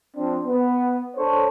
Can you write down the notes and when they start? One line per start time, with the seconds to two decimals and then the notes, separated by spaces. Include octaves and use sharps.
0.16 F3 C4 D4
0.46 B3
1.17 D4 A4 C5 C#5